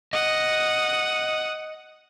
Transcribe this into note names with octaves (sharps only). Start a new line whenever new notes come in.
D#5 F#5 D#6